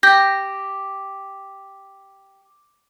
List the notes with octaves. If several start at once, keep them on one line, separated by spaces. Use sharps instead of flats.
G4 G6 A#6 B6